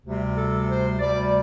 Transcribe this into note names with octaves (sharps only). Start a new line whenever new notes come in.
D2 C3 G3
A4
C5
D2 C3 G3 D5